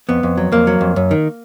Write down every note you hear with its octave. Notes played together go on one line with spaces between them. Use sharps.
F2 B3
F2
F#3
F2 A#3
F#3
F2
F#2
D#3